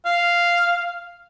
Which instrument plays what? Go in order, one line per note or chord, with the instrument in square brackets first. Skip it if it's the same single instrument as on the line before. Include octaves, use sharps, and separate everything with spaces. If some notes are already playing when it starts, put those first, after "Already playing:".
[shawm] F5